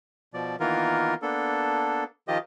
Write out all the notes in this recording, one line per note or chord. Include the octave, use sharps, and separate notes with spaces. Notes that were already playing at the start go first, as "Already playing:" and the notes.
B2 F3 D5
D#3 E3 A#3 B3 F4 A#4
A#3 B3 D4 A4
D#3 F3 F4 G4 D#5